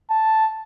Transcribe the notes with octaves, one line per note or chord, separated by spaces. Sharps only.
A5